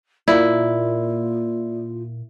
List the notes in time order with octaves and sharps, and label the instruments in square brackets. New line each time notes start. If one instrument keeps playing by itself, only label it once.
[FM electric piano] A#2 A#3 [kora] E4 [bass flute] F4 [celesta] D5 E5